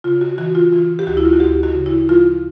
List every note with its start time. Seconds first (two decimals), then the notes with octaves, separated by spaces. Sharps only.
0.04 C#3 F4
0.21 F#4
0.38 E3 F#4
0.55 F4
0.72 E3 F4
0.99 G4
1.07 D2 F#4
1.17 E4
1.25 F4
1.33 F#4
1.40 D2 G4
1.63 F#4
1.74 C#3
1.86 E4
2.09 F3 F4